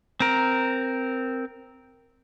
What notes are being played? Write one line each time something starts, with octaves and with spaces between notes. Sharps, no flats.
C4 A#4